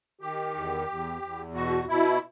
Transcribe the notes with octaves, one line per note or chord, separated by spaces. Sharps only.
D#3 G4
E2
E2
E2
B2 F#4
B2 E4